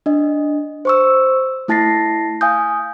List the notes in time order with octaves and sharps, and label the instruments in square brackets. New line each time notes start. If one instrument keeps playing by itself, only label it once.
[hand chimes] D4 D#5
C5 C#6 E6
A3 E4 A5 A6 A#6 C7
F5 G#5 D#6 G6